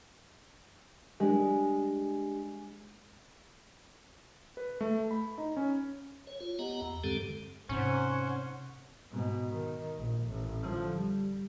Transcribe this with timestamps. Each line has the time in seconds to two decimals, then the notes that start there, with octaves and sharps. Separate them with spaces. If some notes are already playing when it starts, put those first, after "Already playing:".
1.20 G#3 D4 G4
4.57 B4
4.81 A3
5.11 B5
5.38 D#4
5.57 C#4
6.27 C#5
6.40 F4 C#5
6.59 B3 G4 D#5 F#5 A#5
6.81 E2 A#5
7.04 G2 D3 G#3 C4 G4 A4
7.69 G#2 C3 C#4 C5 F#5
9.11 G#2 B2
9.49 D#3
9.97 A#1
10.28 A1
10.61 D3 F3
10.96 G3